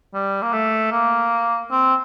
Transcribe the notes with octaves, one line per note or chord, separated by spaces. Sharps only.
G3
A#3
A3
A#3
C4